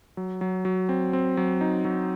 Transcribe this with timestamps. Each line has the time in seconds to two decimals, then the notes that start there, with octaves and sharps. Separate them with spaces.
0.17 F#3
0.41 F#3
0.65 F#3
0.89 C4
1.13 C4
1.37 F#3
1.61 D#4
1.85 F#3